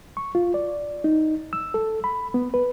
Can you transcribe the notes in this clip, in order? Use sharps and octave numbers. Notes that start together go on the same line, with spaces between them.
C#6
F4
D5
D#4
E6
A4
B5
B3
B4